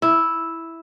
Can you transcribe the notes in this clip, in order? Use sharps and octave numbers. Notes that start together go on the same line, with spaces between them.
E4